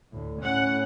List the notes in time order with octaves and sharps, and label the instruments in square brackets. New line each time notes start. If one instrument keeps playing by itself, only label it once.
[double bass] D2 A2
[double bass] A2 C#4 [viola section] F#5